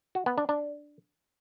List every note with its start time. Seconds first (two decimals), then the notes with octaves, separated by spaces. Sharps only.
0.15 F#4
0.26 B3
0.38 D4
0.49 D4